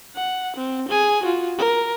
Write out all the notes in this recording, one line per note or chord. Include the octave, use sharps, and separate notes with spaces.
F#5
C4
G#4 G#5
F4 F#4
A#4